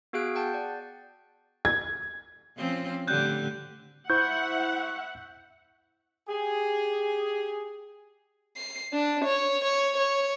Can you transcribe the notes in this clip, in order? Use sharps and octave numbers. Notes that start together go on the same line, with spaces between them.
B3 F#4 G#4 F5 F#6 D7
F#5 G5 A5 G6
D5
G#6
F3 C4 C#4
A2 D3 G3 F#6 G6
E4 C5 E5 F#5 C#6 G6
G4 G#4
C7
D4
C#5
C#5
C#5